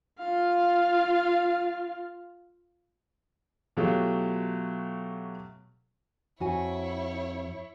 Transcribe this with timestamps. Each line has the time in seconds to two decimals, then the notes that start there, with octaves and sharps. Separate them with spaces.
0.20 F4 F5
3.77 B2 F#3 A3 F4 G4
6.40 F2 E4 F#4 C#5 G#5